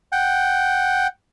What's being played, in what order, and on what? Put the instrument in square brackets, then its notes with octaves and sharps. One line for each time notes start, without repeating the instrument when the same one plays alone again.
[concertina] F#5 G5